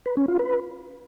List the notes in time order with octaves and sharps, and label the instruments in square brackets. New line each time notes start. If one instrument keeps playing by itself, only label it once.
[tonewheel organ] B4
C#4
F4
B4